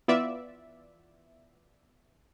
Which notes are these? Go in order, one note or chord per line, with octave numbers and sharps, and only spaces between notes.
E3 B3 F4 D5 E5